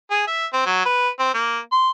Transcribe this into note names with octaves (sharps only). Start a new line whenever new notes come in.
G#4
E5
C4
F#3
B4
C4
A#3
C6